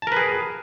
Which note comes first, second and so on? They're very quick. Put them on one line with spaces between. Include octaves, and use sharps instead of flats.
A5 A#4 B4 G#4